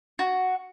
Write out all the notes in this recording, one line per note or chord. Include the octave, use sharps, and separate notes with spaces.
F#4